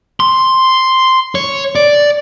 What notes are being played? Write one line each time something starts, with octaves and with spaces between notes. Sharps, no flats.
C6
C#5
D5